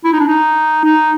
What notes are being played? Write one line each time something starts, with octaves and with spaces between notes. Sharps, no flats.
E4
D#4
D4
D#4
D#4